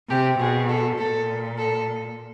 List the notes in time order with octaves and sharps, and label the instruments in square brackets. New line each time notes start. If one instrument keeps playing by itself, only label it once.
[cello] C3 [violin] G4
[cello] B2 [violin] G#4
[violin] A4
[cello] A#2 [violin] A4
[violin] A4